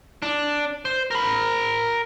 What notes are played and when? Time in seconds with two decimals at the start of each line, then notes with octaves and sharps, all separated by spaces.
0.22 D4
0.85 C5
1.11 A#4 B5